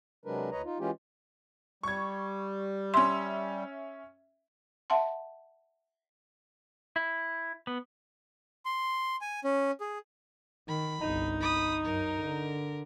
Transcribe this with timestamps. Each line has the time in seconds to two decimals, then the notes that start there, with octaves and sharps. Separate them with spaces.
0.26 C3 F#3 G#3 D4 A#4 B4
0.52 D2 B4 C#5 D#5 A#5
0.64 D#4 F4
0.80 E3 G#3 C#4 F4 G4
1.83 G3 C#6 G#6
2.94 C#4 E5 C6
4.90 E5 F#5 A5 C6
6.96 E4
7.67 B3
8.65 C6
9.21 G#5
9.44 C#4
9.81 G#4
10.68 D#3 B5
11.01 G1 C2 D#4
11.41 B5 D#6
11.85 F#2 A#4
12.21 D3